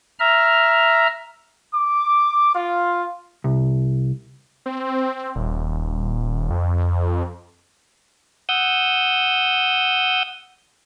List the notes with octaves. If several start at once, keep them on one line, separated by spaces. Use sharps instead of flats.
E5 A#5 F6
D6
F4
C2
C4
D#1
F2
F#5 D#6 E6 G6